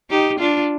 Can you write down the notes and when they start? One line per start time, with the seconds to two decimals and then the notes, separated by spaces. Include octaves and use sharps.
0.10 D#4 G4
0.39 D4 F4